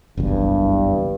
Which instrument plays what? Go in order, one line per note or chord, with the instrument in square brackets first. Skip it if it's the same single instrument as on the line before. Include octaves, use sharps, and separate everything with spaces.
[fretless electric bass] F#1 B1 E2 [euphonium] G2